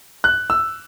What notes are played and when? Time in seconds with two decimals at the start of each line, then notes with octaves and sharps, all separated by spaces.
0.24 F#6
0.50 E6